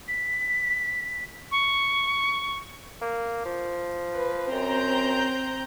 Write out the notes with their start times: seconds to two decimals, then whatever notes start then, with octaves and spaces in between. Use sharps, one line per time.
0.08 B6
1.51 C#6
3.01 A#3
3.45 F3
4.15 B4
4.51 F#2 C4 A#5 G6